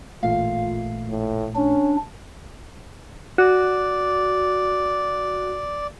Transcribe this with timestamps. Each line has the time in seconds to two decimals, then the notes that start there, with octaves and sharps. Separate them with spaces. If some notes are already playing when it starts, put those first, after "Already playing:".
0.23 A1 A#2 A3 F4 F5
1.09 A2
1.55 C#4 D4
3.38 F#4 D5